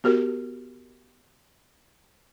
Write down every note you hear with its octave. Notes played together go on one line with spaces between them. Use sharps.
B3 F#4 G4 A#4